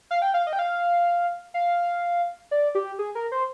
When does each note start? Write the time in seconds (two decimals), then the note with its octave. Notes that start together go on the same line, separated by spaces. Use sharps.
0.11 F5
0.22 G5
0.34 F5
0.47 D#5
0.53 G5
0.59 F5
1.54 F5
2.51 D5
2.75 G4
2.99 G#4
3.15 A#4
3.32 C5